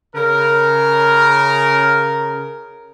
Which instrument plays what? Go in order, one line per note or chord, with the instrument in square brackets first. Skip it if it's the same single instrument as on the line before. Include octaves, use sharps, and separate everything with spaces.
[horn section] C#3 A#4